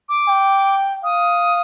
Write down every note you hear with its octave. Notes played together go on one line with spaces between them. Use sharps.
D6
G5
F5 D#6